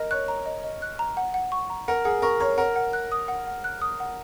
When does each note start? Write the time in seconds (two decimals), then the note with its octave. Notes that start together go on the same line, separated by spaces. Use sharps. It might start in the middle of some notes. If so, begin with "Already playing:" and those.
Already playing: A#4 D#5
0.11 C#5 F#6
0.28 A#5
0.46 D#5
0.64 D#5
0.82 F#6
0.99 A#5
1.17 F#5
1.34 F#5
1.52 C#6
1.70 A#5
1.88 A#4 F#5
2.05 G#4 F#5
2.22 A#4 C#6
2.40 C#5 A#5
2.58 A#4 F#5
2.76 F#5
2.93 F#6
3.12 D#6
3.28 F#5
3.47 F#5
3.64 F#6
3.81 D#6
4.00 F#5